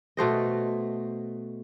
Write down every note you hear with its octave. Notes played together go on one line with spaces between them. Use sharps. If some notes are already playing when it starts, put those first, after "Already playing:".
B2 A3 C5 D#5